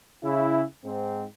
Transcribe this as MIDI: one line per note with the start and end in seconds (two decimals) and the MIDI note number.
0.24 0.64 49
0.24 0.64 64
0.85 1.25 44
0.85 1.25 60